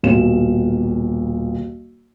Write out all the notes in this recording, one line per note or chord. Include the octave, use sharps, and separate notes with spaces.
D#1 B1 E7